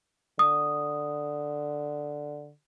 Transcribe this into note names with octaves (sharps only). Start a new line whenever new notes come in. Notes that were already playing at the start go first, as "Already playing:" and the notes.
D3 D#6